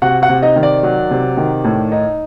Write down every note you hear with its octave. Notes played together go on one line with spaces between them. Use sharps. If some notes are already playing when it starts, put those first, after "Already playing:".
C3 F#4 F#5
F#4 F#5
C3
D#4 D#5
D#3
D5
F#3
C3
D#3
A2
D#4